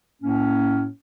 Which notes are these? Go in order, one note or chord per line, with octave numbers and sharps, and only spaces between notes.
A2 A#3 C#4